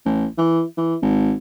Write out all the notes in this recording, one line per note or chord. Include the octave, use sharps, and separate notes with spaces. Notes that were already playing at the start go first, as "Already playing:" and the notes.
A1
E3
E3
G#1